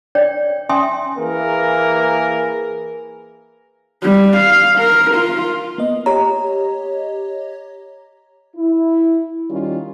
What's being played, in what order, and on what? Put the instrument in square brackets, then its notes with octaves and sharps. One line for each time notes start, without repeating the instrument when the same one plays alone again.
[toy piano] D4 C#5 D5 G5
C#4 E5 G5 G#5 C6 D#6
[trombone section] E3 A#3 G#4 A#4
[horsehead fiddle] G3
F5
A#4
F4
[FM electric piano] A#3 B3 D#5
[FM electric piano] G4 C#5 D#5 [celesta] A#5
[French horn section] E4
D#3 G3 C#4 F4